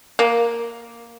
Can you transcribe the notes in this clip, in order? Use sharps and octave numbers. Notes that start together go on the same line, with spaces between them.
A#3